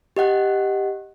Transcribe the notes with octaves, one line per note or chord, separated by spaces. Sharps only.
G4 D#5 F#5 F#6